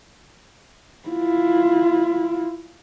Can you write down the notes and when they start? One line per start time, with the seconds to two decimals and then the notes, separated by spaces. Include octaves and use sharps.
1.09 E4 F4